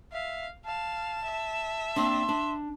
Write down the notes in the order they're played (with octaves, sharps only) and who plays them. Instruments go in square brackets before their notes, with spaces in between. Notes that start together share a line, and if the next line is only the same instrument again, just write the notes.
[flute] E5 [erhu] F5
[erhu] F5 [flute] A5
[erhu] E5
[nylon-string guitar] A#3 C4 D4 [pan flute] C6
[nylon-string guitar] D4